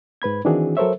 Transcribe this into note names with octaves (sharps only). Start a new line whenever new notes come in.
G#2 B4 B5 G#6
D#3 E3 C4 D4 F#4 G#4
F#3 A4 A#4 C5 C#5 E5